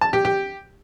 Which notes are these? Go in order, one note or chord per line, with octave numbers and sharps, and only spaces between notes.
A5
G4
G4